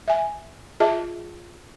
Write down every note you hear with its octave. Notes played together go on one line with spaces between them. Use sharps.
E5 G#5
F4 G#4 D#5 E5 A5